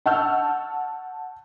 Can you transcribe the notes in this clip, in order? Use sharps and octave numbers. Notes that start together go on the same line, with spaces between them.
F#5 A5 C#6 E6 F6 G6